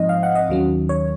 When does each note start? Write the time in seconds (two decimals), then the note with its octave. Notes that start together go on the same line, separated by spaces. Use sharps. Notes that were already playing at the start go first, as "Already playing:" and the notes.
Already playing: G#2 F3 C4 D#4 D#5
0.09 F5
0.23 F#5
0.35 D#5
0.49 D#2 D#3 F#3 C#4
0.89 C#5